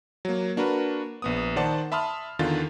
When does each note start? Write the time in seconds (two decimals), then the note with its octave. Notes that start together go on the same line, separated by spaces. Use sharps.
0.25 F#3 A#3
0.57 A#3 D4 F#4 A#4 B4
1.22 A#1 B3 D#6
1.56 D#3 C5 D5 F#5 A5
1.92 E5 A5 B5 C6 D#6 F6
2.39 E2 D3 D#3 F4 A6